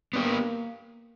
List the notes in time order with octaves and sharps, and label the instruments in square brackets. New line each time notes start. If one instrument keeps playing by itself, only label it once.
[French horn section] A#3 [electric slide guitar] B3 D4 G4